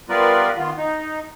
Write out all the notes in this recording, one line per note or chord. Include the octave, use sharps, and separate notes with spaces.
G3 B3 F4 A#4 B4 D5
D#3 B3 F4
D#4